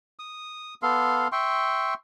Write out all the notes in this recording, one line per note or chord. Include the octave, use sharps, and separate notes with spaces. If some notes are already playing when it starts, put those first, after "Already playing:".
D#6
B3 A4 F5 C6
E5 G5 C6 C#6